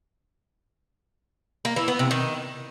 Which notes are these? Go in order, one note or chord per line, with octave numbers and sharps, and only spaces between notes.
A#3
E3
B3
C3
D#3